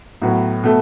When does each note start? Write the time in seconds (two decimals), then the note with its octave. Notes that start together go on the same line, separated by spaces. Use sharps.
0.22 A2 F#3 B3 F#4 B4
0.64 B2 A3